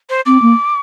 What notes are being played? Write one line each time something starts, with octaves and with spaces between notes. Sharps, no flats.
C5
C4 D6
A#3